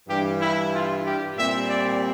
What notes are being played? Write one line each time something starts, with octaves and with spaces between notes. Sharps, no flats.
G2 E3 G3 D4 G4
E4
F4
G4
A#2 G3 C4 E5
D5